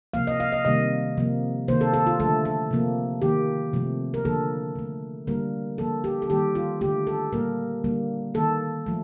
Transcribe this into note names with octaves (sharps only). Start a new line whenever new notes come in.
C3 F3 A#3 F5
D#5
F5
D#5
C3 D#3 G3 A#3 D#5
C3 F3 A#3
C3 D#3 A#3 C5
A4
A4
F4
D3 F3 A3 A4
A4
C3 F3 A#3
D#3 A#3 G4
C3 F3 A3
A#4
D3 F3 A#3 A4
D3 A3
D3 G3 A#3 A#4
D3 F3 A#3 A4
G4
A4
D#3 G3 A#3 G4
F4
D3 A3 G4
A4
A#2 G3 A#3 A#4
D3 G3 A#3
D#3 A#3 A4
F3 A3